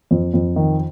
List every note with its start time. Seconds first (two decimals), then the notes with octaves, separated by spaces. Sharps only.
0.11 F2
0.34 F2
0.56 D#3